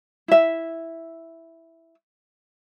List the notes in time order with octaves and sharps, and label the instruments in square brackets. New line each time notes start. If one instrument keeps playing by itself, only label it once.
[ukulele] E4 E5